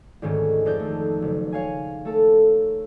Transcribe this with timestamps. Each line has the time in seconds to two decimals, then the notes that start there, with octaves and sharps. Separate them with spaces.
0.22 D2 G#2 D#3 C#4
0.65 F2 D#4 D5 G6
0.79 A3
1.22 F#1
1.52 C#5 F5 G#5
2.05 A3 A4 A#4